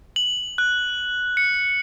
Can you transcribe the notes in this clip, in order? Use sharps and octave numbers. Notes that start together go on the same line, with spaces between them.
F#7
F#6
C#7